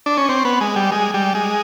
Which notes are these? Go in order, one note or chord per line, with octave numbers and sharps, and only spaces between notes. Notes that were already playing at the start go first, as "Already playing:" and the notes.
D4
C#4
C4
B3
G#3
G3
G#3
G3
G#3